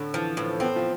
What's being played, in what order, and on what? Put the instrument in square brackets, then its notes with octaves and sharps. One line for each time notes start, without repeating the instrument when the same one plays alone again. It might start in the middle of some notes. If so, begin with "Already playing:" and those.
Already playing: [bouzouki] A2 [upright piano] D3
[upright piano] E3 [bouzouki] F3
[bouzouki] A2 [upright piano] E3
[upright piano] B3 [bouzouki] C4
[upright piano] F3